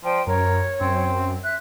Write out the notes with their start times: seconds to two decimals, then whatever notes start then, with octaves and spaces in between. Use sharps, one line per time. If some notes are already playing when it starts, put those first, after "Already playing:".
0.04 F3 C5 D5 G5
0.27 F#2 A#4 C#5
0.81 F#2 C4
1.42 E5 F#6